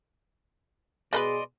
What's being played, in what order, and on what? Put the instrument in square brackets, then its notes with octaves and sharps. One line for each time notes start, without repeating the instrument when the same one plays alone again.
[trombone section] B2 G#4 [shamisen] G#3 A#4 B4 [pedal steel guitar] D5 D#5 C6